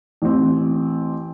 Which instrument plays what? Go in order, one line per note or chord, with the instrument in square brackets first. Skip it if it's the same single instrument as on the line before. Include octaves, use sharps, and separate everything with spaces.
[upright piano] A1 C4